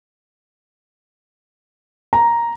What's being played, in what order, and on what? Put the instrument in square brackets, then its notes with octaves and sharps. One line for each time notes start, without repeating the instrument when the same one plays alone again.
[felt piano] A#5